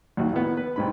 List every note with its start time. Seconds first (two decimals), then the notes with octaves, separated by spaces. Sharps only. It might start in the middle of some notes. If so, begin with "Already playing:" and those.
0.17 A#1 D#2 F#4
0.33 A2 D#3 B3
0.57 B4
0.76 C2 G#2 B5